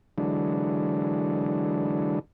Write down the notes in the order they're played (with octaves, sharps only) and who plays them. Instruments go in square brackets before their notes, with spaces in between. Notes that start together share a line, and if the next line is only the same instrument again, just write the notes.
[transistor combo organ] D3 E3 F#3 G#3 D4